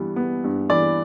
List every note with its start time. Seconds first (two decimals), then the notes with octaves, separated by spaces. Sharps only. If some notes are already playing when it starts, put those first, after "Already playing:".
Already playing: G2 E3 G3 B3
0.16 B3
0.44 G2
0.70 E3 D5